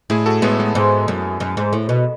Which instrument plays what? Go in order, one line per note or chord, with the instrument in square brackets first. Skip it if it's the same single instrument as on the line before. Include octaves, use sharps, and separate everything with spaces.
[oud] A2 [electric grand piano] E4 G#4
[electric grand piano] F#4 A4
[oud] A2 [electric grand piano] G#3 B3
[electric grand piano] G#3 B3
[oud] G#2
F#2
F#2
G#2
A2
B2